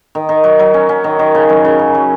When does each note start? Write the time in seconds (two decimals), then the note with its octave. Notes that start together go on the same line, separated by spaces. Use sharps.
0.15 D#3
0.29 D#3
0.44 F#3
0.59 F#3
0.74 C#4
0.89 C#4
1.04 D#3
1.19 D#3
1.35 C#3
1.49 F#2
1.65 C#3
1.79 C#3
1.95 F#3